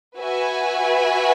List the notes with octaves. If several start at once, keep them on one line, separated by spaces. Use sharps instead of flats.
F#4 B4 E5 G#5